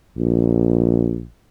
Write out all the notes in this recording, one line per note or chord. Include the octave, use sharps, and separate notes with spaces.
A#1